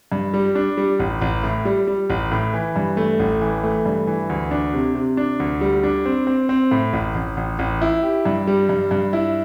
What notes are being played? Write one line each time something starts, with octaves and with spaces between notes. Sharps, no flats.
G2
G3
D4
G3
A1
A1
A2
G3
G3
A1
A2
E3
G2
A3
A1
E3
A3
G2
E3
D2
D4
C3
C3
D4
D2
G3
D4
C4
C4
C4
A2
A1
A1
A1
A1
E4
G4
G2
G3
G2
G2
E4